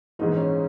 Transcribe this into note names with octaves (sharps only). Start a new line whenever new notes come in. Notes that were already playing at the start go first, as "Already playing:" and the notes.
A#1 G#2 E3 G#3 D#4
C#4